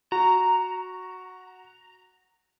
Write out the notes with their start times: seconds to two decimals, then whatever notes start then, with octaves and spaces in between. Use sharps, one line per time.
0.12 F#4 A#5